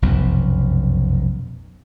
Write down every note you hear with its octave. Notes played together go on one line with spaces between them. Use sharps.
F1 B1 F#2 B2